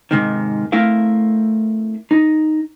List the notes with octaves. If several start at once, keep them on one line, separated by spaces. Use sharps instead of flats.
G#2 C3 D#3
A3 C4 E4 A#4 F5
D#4